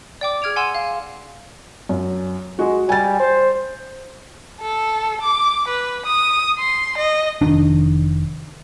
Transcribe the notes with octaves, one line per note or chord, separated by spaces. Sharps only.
D5 G5 D6
G#4 F6 G#6 D7 F7
F#5 G#5 C6 E6 E7
F5
F#2
G#3 F#4
G3 G#5 A6
C5
A4
D6
B4
D#6
C6
D#5
F1 D#3 D4